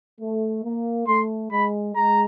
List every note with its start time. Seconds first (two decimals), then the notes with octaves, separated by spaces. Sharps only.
0.20 A3
0.64 A#3
1.08 A3 C6
1.51 G#3 B5
1.95 G#3 A#5